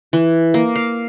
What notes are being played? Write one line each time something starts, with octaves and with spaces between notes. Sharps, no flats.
E3
A#3
F5